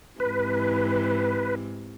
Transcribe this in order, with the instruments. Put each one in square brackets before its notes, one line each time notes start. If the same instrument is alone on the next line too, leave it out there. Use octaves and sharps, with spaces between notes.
[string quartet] G#2 C3 E3 [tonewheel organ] B4